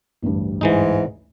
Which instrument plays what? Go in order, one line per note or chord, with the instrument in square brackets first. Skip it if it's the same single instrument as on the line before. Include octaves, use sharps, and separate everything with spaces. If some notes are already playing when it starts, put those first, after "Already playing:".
[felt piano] A1 D2 G2
[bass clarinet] G#2 [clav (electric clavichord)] E3 G#3 D#4